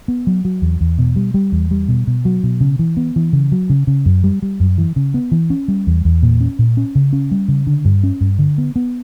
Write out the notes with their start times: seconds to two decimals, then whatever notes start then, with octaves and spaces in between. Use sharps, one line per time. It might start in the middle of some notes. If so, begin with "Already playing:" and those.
0.08 B3
0.27 F#3
0.45 F#3
0.62 E2
0.81 E2
0.98 B2
1.16 G3
1.34 G3
1.52 E2
1.71 G3
1.88 B2
2.07 B2
2.25 F#3
2.43 B2
2.61 C#3
2.79 E3
2.97 B3
3.16 E3
3.33 C#3
3.52 F#3
3.70 C#3
3.87 C#3
4.06 F#2
4.24 G3
4.42 G3
4.60 F#2
4.78 E3
4.96 C#3
5.14 B3
5.32 E3
5.50 C#4
5.68 G3
5.87 E2
6.05 E2
6.23 A#2
6.41 C#4
6.59 A#2
6.77 C#4
6.95 C#3
7.13 C#4
7.31 G3
7.48 C#3
7.67 D3
7.85 G2
8.03 C#4
8.21 G2
8.39 D3
8.58 B3
8.76 B3